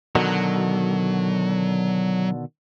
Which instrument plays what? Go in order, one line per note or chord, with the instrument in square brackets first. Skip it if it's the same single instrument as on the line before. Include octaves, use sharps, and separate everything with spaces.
[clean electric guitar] B2 D3 D#3 [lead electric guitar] F#3